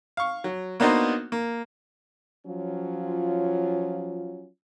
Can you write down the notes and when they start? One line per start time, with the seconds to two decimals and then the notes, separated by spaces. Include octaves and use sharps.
0.17 F5 C#6
0.44 F#3
0.80 A#3 B3 D4 D#4 F#4 C5
1.32 A#3
2.47 F3 F#3 C#4 F4